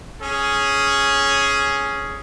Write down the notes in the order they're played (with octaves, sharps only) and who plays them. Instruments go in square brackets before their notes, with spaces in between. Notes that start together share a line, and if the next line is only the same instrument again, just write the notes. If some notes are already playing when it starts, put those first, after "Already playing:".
[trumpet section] C#4 G#4